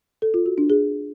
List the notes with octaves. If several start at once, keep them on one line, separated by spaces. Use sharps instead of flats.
A4
F4
F#4
D4
G#4